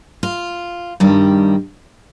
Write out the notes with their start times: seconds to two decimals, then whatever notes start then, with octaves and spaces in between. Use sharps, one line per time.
0.23 F4
1.00 G2 D#3 G3